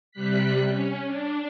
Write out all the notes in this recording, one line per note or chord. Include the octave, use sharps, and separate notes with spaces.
C3 G3 F#6 B6
C#4
D4